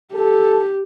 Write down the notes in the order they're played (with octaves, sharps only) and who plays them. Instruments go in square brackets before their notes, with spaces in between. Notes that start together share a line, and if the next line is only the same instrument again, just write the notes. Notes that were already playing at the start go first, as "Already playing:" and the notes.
[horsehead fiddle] G4 [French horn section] A4